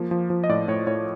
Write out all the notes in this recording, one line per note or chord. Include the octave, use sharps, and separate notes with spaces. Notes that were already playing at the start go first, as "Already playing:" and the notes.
Already playing: F3 A#3
F3
F3
D#5
A2 D5
A2 C#5
A2 C#5